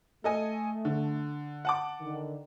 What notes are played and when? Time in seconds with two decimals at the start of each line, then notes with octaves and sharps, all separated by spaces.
0.24 A3 A4 D#5 G#5
0.85 D3
1.65 F#5 A5 D6
2.00 D3 D#3